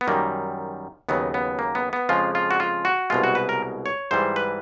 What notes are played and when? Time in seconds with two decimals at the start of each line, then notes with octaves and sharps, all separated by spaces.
0.01 B3
0.07 F#2 D#3 G3 A#3
1.09 D#2 C#3 F#3 B3
1.34 B3
1.59 A#3
1.75 B3
1.93 B3
2.09 F2 C#3 F3 G#3 F4
2.35 F4
2.51 F#4
2.60 F4
2.85 F#4
3.10 C2 B2 G#3 F4
3.24 F#4
3.35 B4
3.49 A#4
3.86 C#5
4.11 G#2 E3 G3 C5
4.36 B4